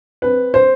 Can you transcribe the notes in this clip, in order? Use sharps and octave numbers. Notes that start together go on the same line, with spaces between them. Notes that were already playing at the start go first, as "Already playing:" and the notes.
C4 B4
C5